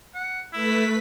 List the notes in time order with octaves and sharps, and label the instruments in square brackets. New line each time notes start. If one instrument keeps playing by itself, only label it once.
[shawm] F#5
[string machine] A3 B4 B6 [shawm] E4